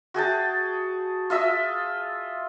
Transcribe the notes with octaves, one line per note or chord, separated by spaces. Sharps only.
F#4 G#4 G5 A5
F4 D#5 E5 E6